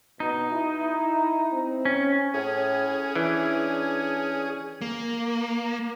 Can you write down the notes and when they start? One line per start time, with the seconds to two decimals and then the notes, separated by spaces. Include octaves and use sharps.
0.20 B2 D#4
0.52 E4
1.53 C4
1.85 C#4
2.34 A2 C#4 G#4
3.15 E3 D4
4.82 A#3